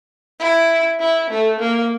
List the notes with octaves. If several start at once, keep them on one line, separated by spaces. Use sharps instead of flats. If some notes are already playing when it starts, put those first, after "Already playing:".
E4
E4
A3
A#3